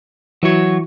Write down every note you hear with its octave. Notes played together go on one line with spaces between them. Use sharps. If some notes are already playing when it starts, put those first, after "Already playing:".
E3 F#3 E4 F#4 C#5